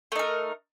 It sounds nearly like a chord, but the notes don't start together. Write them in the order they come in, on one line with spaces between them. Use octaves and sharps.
A3 D#4 A#4